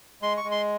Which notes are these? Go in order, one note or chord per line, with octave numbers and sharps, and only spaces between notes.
G#3 C6
C#6
G#3
C6